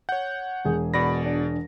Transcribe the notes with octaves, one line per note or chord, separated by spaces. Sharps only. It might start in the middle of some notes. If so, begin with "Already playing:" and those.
C#5 F#5 G6
E1 G#4
B2 D5 B5 A#6
D4